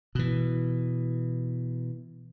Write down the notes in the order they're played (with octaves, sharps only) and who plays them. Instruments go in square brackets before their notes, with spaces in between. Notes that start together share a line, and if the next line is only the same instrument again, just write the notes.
[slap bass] B2 E3